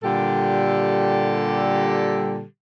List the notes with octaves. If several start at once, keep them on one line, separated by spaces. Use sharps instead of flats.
A#2 D3 G3 G4 A4